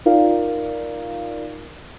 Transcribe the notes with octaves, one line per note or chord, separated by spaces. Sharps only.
D#4 F4 A#4 D5 F5